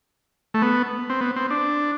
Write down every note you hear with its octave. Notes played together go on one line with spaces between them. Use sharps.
A3
B3
C4
B3
C4
D4